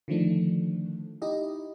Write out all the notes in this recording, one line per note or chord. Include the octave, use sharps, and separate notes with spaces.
D3 D#3 F3 A3 D4
D#4 E4 G4 D#5